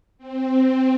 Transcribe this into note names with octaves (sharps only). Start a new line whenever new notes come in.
C4